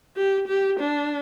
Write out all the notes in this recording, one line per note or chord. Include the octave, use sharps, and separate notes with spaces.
G4
G4
D4